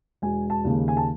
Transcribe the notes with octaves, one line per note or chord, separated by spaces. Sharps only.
E1 G#5
A5
D#2 C#3
G#5
A5